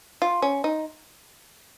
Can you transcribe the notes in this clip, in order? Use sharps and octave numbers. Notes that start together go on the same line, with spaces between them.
F4
C#4
D#4